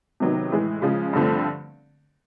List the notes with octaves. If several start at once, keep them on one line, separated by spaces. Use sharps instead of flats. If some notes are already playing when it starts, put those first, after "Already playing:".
C3 D#3 F#3 B3 D#4
A2 E3 G#3
C#3 F3 G#3
G2 D3 F3 A3 C4